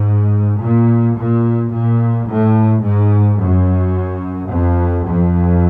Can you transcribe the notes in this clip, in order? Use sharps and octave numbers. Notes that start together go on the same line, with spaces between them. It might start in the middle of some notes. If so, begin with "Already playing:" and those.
Already playing: G#2
A#2
A#2
A#2
A2
G#2
F#2
F2
F2